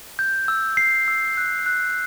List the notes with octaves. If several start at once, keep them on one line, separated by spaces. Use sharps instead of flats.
G6
E6
E6 C7
E6
F#6
F#6